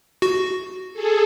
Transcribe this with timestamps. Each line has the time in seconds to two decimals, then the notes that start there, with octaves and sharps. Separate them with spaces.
0.22 F#4
0.93 G#4 A4